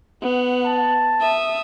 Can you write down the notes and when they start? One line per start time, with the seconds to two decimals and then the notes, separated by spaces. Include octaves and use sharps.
0.22 B3 F#5
0.65 A5
1.21 E5 D#6